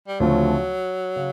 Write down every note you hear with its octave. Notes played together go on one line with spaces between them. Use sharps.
G3
D2 C#3 F3 F#3 A3 C4
C#3